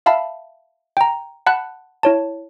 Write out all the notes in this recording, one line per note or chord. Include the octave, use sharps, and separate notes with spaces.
E5 F5 A5 B5
G5 A#5
F#5 A5 B5 F#6
E4 C#5 A5